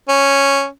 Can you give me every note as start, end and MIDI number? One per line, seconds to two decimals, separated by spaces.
0.09 0.66 61